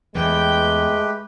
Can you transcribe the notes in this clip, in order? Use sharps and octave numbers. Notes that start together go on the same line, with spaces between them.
E2 E3 G#3 A3 G4 B4 G5